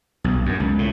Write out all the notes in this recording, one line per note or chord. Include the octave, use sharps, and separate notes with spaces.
B1
F#2
C#2
A2